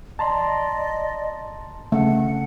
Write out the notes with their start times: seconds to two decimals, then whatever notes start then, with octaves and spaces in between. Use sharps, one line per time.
0.19 D5 D#5 A5 A#5 C6
1.92 C#3 A3 F#5